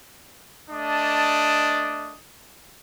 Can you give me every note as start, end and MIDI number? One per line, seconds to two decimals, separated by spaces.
0.70 2.16 57
0.70 2.16 62
0.70 2.16 75
0.70 2.16 81
0.70 2.16 86
0.70 2.16 87